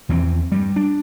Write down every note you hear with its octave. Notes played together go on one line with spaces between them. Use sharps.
E2 E3 F3 C4
G2 G3
D4